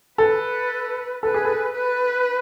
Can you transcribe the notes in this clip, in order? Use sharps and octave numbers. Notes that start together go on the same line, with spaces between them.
A4 B4
A4 B4
G#4
A4
B4